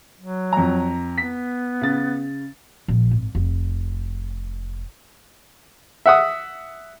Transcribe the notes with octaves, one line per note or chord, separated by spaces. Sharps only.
F#3
F2 A#5
B3 B6
C#3 A6
A#1
G#1
F1
E5 F#5 D#6